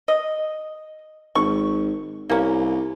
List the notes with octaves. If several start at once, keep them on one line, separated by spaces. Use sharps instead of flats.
D#5
G#1 C#6
C2 A#3 C#4